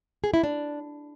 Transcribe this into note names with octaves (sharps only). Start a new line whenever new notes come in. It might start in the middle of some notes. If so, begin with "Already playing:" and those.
G#4
E4
D4